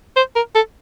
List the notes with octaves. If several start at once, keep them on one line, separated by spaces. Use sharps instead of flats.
C5
A#4
A4